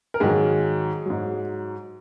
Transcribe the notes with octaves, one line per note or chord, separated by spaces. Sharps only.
A#4
G#2 D#3 F#3 G#4
G#2 F#3